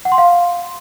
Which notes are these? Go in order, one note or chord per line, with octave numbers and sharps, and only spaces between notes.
F#5
C6
F5